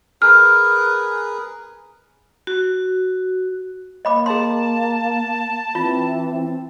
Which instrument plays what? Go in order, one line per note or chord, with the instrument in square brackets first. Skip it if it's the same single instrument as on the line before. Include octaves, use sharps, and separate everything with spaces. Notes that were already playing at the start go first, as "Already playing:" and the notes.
[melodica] G#4 A#4 B4 [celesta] F6
[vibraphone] F#4
[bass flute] A#3 [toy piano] D#5 B5 D6
[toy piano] G#4 C6 [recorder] A5
[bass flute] E3 [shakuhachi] C4 [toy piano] F4